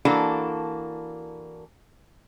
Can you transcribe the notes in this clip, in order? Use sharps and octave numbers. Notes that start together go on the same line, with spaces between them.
E3 A#3 D4 F#4 A4